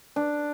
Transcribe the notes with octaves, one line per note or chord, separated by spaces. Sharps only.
D4